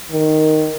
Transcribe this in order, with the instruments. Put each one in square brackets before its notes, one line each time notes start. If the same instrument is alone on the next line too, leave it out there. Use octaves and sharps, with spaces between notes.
[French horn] D#3